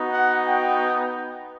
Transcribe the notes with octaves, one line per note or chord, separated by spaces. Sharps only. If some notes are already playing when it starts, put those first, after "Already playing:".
Already playing: B3 D#4 F#4
F#5
G5